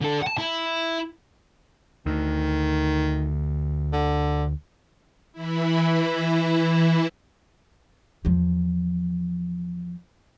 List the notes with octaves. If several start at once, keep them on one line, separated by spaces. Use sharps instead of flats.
D3 A4
F#5 A5
E4
D2 D#3
D3
E3 E4
E2 F3